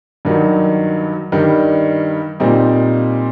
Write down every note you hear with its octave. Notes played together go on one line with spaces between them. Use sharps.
G2 D#3 F#3
G2 D#3 G3
A#2 G3 C4 D#4